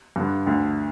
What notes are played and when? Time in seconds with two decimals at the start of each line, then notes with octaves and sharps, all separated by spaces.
0.16 G2 D3
0.46 D2 D3